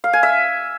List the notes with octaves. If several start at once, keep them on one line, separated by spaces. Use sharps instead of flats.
F5
G#5
E5